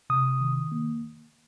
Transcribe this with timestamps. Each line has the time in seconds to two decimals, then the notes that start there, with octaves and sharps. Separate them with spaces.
0.10 C3 D#6
0.41 D#3
0.72 A#3